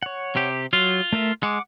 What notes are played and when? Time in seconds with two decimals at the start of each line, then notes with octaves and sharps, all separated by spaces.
0.03 C#5 F#5
0.36 C3 G4
0.73 F#3 F4
1.13 A3 A#4 E5
1.43 G#3 F#5 D6